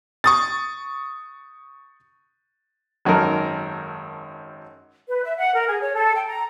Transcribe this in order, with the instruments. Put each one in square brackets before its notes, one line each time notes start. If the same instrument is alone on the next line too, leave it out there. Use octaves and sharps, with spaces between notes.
[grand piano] C#6 D#6 A6
[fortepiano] G#1 F#2 A4 A#4
[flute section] B4
E5
F#5
A#4
G#4
C#5
A4
G5
A#5